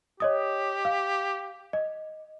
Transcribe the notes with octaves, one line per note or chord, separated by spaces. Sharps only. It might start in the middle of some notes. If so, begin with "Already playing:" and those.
G4 C#5 D#5 D#6
F5
D#5